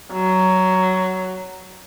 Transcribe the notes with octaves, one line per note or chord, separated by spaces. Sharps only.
F#3